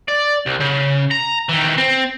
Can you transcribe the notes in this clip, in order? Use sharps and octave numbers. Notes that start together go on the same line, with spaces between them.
D5
C2
C#3
A#5
D#3 E3
C4